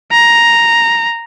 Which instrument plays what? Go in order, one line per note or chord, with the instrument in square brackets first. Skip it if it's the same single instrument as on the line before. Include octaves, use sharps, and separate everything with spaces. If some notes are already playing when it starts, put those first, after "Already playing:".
[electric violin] A#5